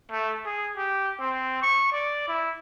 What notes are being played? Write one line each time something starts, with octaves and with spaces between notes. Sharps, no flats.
A3
G#4
G4
C4
C#6
D5
E4